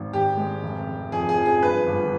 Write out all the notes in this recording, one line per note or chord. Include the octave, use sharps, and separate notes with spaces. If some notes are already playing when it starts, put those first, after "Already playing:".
Already playing: G#1 G#2
G#1 G4
G#3
F1
F1
F2 G#4
G#4
F3
G#4
G2 B4
G1